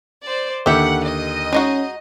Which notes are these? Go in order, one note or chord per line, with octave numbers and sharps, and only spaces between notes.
C5 D5
D#2 D3 G4 E5 F#5
D#5
G#3 C#4 D#4 F#4